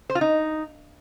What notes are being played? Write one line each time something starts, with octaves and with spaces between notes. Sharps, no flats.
C5
F4
D#4